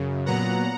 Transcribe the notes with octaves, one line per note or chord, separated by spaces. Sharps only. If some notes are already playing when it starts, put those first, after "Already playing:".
Already playing: F#2 C#3
A#2 F#3 B3 F#5 A#5